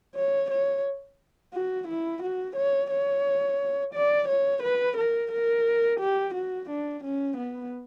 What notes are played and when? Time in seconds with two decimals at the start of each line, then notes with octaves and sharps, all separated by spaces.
0.15 C#5
0.50 C#5
1.53 F#4
1.87 E4
2.23 F#4
2.56 C#5
2.91 C#5
3.94 D5
4.28 C#5
4.63 B4
4.97 A#4
5.31 A#4
6.00 G4
6.34 F#4
6.69 D4
7.04 C#4
7.37 B3